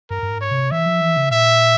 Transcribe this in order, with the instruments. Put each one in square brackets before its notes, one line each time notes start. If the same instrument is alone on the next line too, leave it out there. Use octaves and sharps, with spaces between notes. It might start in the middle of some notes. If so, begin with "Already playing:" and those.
[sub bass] G2 [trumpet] A#4
[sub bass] G2
G#2
[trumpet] C#5
[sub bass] C3
[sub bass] E3 [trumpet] E5
[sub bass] F3
E3
C#3
[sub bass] A#2 [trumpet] E5